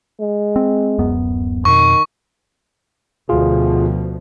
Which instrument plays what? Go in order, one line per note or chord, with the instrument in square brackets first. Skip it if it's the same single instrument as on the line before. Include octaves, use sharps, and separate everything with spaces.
[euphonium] G#3
[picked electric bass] C4
D1 F#2 B3
[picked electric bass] F2 B2 [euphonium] D#3 [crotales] C#6
[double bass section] D2 B2 F3 [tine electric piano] F4 G#4